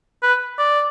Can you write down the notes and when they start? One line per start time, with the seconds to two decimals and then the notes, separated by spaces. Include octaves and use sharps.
0.23 B4
0.59 D5